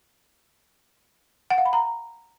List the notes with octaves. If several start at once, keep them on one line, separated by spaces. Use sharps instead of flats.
F#5
F5
B5
A#5